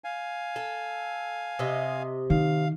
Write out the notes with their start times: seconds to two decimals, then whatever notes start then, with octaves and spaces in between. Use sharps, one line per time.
0.04 F5 G#5
0.56 A4
1.59 C3 D#5
2.30 D#3 F5